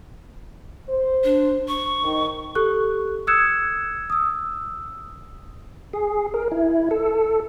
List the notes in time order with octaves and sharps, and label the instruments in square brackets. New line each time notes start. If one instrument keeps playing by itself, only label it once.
[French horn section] C5
[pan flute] D4
C#6
[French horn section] D#3
[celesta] G4 A4 C#6 F#6
D#6 E6 F#6 G#6 C#7 E7
D#6 E6
[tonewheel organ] G#4
A#4
E4
A4